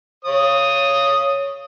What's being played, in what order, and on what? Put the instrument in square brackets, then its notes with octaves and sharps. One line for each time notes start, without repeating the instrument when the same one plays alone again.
[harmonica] C#5 D#6